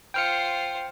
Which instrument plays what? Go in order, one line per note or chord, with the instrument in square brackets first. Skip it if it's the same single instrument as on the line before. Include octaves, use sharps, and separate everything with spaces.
[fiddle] F4 C5 [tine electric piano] G5 F6 C#7